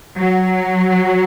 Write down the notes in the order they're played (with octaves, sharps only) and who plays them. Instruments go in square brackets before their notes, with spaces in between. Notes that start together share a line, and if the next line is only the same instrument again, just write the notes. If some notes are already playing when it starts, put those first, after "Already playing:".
[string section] F#3